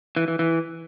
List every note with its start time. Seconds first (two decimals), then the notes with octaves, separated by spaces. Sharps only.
0.16 E3
0.28 E3
0.39 E3